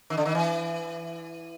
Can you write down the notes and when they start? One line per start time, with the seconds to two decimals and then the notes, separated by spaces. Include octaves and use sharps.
0.10 D#3
0.17 D3
0.25 D#3
0.35 E3